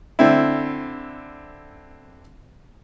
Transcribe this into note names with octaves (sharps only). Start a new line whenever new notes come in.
D3 C4 E4